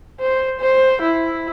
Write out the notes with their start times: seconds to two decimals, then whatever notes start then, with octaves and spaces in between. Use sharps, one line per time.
0.20 C5
0.60 C5
1.02 E4